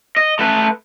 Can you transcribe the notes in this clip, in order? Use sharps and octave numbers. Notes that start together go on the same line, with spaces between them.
D#5
A3 B4